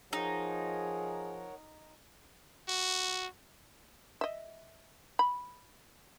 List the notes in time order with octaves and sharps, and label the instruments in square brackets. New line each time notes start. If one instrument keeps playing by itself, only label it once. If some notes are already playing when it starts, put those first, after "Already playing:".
[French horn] F3 [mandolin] D#4 [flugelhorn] G#4 [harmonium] A#4 C#5 F#5
[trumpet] F#4
[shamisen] D#5 E5
B5